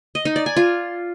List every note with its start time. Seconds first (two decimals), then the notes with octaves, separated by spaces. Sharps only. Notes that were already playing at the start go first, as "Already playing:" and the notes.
0.15 D#5
0.25 D#4
0.36 D5
0.46 G#5
0.56 F4